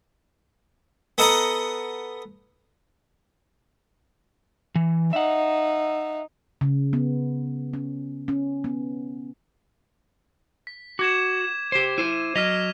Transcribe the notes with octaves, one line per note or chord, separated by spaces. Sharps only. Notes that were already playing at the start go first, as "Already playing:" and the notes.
B3 A4 D#5 F#5 A#5
E3
D#4 E5 F#5
C#3
B3
C#4
C#4
B3
B6
F#4 D6 G#6 E7
G4 C5
E4 C5 D#7
F#3 D#5 F6 B6 F7